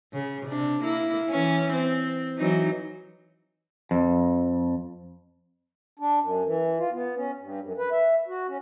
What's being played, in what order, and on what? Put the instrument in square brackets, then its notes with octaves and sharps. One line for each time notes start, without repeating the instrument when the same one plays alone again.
[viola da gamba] C#3
C3 D4
A#3 E4
E3 C#4
C4
E3 F#3 D#4
[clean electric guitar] F2
[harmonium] D4
F#2
E3
F4
B3
C#4
G2
F#2
B4
E5
F#4
C#4